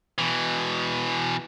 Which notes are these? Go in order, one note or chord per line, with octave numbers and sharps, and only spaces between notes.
B2 E3